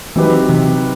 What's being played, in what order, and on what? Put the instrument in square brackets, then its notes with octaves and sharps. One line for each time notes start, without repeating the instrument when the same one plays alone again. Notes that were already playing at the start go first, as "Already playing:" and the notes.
[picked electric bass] E3 [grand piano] F#3 C4 D#4 G4 B4
[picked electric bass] C3